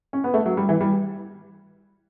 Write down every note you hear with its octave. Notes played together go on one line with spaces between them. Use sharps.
C#4
B3
A3
F#3
G3
E3
G3